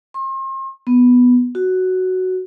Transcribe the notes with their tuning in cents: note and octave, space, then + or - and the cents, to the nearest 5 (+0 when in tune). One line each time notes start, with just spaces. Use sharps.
C6 +40
B3 +0
F#4 +5